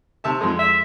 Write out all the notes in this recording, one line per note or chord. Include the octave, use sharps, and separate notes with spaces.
C3 E5 A5
F2 G#3
E5